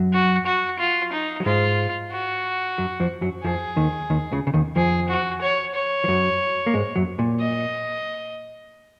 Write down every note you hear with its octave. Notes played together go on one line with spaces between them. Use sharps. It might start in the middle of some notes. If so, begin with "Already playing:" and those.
Already playing: F#2 F#3
F#4
F#4
F4
D#4
F#3
G#2 G#3 F4
F#4
F#2 F#3
F2 F3
F#2 F#3
F2 F3 G#4
D#2 D#3
D#2 D#3
C#2 C#3
C#3
D#2 D#3
F2 F3 G#4
F#4
C#5
C#5
F3
F#2 F#3
A#3
G#2 G#3
F#2 F#3
A#2
D#5